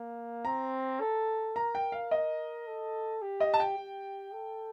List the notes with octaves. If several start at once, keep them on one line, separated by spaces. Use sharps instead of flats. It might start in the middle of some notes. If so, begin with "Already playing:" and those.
Already playing: A#3
C4 A#5
A4
A#4 A#5
G5
F5
D#5
A4
G4
D#5
A5
G5
G4
A4